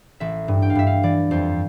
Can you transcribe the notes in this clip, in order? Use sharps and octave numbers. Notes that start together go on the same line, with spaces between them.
A1 E5
G2
G5
F5
G2 E5
F5
E3 D5
F2 C5